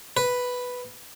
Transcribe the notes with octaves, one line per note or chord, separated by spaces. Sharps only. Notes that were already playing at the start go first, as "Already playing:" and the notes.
B4